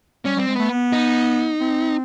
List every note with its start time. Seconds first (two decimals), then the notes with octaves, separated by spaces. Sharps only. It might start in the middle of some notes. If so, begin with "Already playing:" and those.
0.25 G3 C#4
0.36 G3 C4
0.48 G#3
0.55 A3 B3
0.70 B3
0.93 D#4
1.61 C4